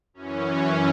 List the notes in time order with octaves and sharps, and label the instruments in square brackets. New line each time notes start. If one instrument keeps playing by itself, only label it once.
[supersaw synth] F#2 E3 C#4